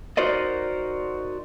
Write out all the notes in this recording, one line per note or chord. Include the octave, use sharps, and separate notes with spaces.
D#4 F#4 A#4 C5 D5 D#5